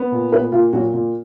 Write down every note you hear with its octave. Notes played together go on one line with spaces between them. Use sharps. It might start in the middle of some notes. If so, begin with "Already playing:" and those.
Already playing: B3
A#2
A#2 B3 B4
A#2 F4
A#2 F#3 F#4
A#2